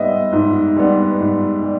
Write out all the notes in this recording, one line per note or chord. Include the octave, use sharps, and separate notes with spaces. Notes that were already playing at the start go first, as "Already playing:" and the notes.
Already playing: G#2 G3 B3 D#5 E5
G#2
G3 B3
G#2
G3